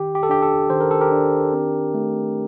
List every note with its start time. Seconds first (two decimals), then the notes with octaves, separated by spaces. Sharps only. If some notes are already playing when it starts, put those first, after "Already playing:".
Already playing: D#3 G4
0.15 G4
0.23 A4
0.29 D4 G4
0.42 A4
0.70 D#3 C5
0.81 A#4
0.91 A4
1.01 G4 A#4
1.12 D4
1.53 C4
1.94 A3